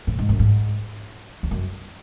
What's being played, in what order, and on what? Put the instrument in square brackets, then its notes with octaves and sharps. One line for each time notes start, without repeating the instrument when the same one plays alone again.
[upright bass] A2
G#2
F#2
G#2
E2
F#2